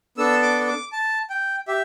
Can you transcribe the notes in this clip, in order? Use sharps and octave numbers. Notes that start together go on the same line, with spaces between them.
B3 D4 A4 E6
D6
D6
A5
G5
G4 E5